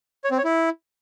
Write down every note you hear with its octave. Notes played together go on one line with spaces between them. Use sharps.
C#5
C4
C#5
E4